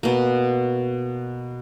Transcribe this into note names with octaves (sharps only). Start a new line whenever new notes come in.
B2 A#3